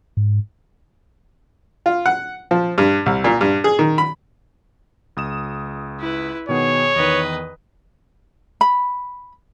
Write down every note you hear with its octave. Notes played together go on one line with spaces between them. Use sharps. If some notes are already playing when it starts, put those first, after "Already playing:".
G#2
F4
F#5
F3
G2
C2
A#2
G2
G#4
D#3
B5
C#2 D#6 E7
E4 B4
B2 D#3 B3 G#4 C#5
E2 D#3 B4 D#5
B5